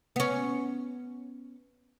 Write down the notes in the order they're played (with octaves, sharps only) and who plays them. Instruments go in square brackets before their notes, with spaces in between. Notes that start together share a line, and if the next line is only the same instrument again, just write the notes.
[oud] B3 C#4